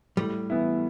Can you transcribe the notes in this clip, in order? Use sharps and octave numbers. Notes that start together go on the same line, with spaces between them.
A2 G3
E3 B3 E4